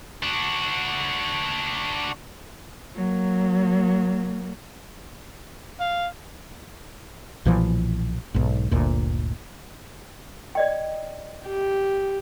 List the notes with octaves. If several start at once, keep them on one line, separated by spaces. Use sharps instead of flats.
D4 F#4
F#3 A#3
F5
B1 A#2 E3 F3
B1 G#2
G1 D2 A#2
D5 D#5 G5
G4